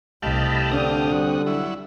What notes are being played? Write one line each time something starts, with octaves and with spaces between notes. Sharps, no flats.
C2 A3 G4 D#5 F5 A5 B5
D3 C4 D4 D#6
G3 F#4
F#3 E4